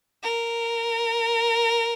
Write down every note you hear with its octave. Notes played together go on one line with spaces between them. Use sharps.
A#4